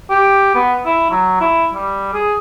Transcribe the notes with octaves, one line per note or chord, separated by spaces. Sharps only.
G4
B3
E4
F#3
E4
G3
G#4